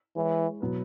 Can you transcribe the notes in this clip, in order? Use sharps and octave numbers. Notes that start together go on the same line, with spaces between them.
E3 G#3 E4 C#5
B2 F#3 B3 E4 B4